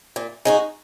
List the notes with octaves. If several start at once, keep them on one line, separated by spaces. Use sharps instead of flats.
A#2
G#3 D#4 F#4